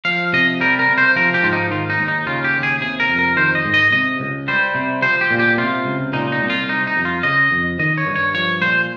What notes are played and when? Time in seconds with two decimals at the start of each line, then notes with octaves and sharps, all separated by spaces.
0.05 F3 F5
0.33 C3 D#5
0.60 G3 A#4
0.79 A#4
0.88 C3
0.98 C5
1.16 F3 A#4
1.34 G4
1.43 G#2 F4
1.53 D#4
1.71 D#3 F4
1.90 D#4
1.99 D#2
2.08 D#4
2.27 C#3 F4
2.44 G4
2.54 D#2
2.63 G#4
2.81 C3 G#4
3.00 A#4
3.09 F2
3.19 A#4
3.37 D#3 C5
3.55 D#5
3.65 G#2
3.74 D#5
3.92 C3 D#5
4.20 C#2
4.48 G3 C5
4.75 C3
5.02 F3 C5
5.21 G4
5.31 A#2
5.39 G4
5.58 C3 F4
5.85 C#2
6.13 A#2 D#4
6.32 D#4
6.41 C2
6.50 F4
6.69 C3 D#4
6.87 D#4
6.96 F2
7.05 F4
7.23 C#3 D#5
7.51 F2
7.79 D#3 D#5
7.98 C#5
8.07 G2
8.16 C#5
8.34 F3 C#5
8.62 A#2 C5